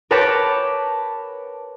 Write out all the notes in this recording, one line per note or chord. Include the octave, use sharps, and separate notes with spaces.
A#4 B4 C#5 G5 A5 D6